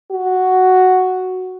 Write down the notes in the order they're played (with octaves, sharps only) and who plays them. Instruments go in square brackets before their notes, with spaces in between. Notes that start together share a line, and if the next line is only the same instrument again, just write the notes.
[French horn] F#4